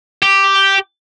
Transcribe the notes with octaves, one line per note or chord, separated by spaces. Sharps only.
G4